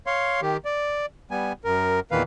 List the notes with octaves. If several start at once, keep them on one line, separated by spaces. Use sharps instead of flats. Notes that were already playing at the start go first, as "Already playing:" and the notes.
C#5 F5 C6
D#3 G4
D5
G3 B3 G#5
F#2 A#4
E2 A#2 D#3 E3 B4 F5